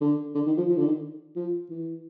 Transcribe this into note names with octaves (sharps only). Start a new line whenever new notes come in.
D3
D3
D#3
F3
F3
D3
D#3
F3
E3